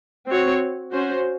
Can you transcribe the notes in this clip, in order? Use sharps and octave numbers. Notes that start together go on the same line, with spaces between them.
C4 F#4 C#5
C#4 F#4 C5